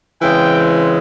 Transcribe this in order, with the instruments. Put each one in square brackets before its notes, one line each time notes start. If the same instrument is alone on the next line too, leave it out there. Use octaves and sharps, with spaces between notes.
[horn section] C#3 E3 G#3 C4 G5